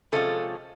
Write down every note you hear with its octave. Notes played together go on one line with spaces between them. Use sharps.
C3 F3 G#3 C#4 F4 A4